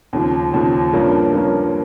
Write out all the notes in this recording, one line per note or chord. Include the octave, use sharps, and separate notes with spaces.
D#2 C#3 F3
D#2 C#3 F3
G2 F3 A#3 C#4
G2 F3 A#3 C#4